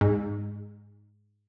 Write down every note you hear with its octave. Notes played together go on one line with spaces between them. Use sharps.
G#2